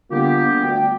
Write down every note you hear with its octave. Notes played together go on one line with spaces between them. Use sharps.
D3 G3 A#3 B3 F4 G4
D2 G5